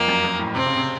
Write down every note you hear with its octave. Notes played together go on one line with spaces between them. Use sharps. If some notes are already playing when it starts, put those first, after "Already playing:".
Already playing: F2 A#3
F#2
F#2
A2
C3 C4
C#3
C3